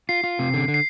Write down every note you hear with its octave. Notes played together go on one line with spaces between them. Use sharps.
F4 C7
F4
C3
D3
D3
C7